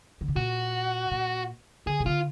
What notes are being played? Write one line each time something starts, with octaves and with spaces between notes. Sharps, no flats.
D3
B2
A#2 F#4
A#2
D3 G#4
B2
D3 F4